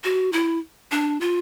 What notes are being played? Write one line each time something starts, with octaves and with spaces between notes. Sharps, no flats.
F#4
E4
D4
F4